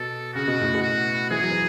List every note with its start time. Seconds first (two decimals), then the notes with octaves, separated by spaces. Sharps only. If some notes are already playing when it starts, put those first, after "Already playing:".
Already playing: B2 A4
0.34 C#3 F#4
0.48 B2
0.61 A2
0.75 B2
0.82 F#4
1.30 E3 G#4
1.41 F#3
1.51 E3